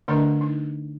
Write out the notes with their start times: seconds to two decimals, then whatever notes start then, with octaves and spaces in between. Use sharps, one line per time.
0.08 D3 A3 D4 A#4 D#5 A#5
0.41 D#4